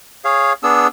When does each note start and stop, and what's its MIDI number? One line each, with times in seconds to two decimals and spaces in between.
0.25 0.53 68
0.25 0.53 73
0.25 0.53 77
0.63 0.87 59
0.63 0.87 62
0.63 0.87 68
0.63 0.87 88